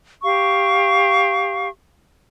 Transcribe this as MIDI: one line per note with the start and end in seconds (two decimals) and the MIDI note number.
0.23 1.69 67
0.23 1.69 77
0.23 1.69 85